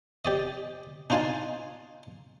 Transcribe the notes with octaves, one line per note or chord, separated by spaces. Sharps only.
G4 D5 D#5
D4 D#4 F4 F5 G#5 A5